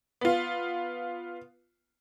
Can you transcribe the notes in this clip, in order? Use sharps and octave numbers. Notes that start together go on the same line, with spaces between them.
B3 F4